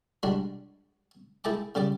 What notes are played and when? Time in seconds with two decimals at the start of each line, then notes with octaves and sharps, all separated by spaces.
0.23 G3 G#3 D4 F#4
1.44 E4 G#4 G5 A5 D6
1.75 C#3 G3 D5 D6